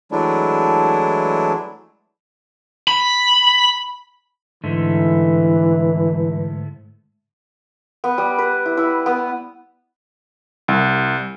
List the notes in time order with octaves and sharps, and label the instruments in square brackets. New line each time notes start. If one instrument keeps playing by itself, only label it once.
[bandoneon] E3 F#3 G#3 A3 D4 E4
[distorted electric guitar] B5
[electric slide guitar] G#2 D3 A3 [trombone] E3
[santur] B3
G3
B4
E4
E4
B3
[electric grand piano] C2